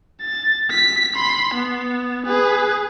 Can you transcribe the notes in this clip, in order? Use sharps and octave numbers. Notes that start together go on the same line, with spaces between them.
A6
B6
B5 C6
B3
G#4 B4